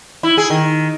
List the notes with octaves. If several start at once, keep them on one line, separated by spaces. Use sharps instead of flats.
E4
G#4
D#3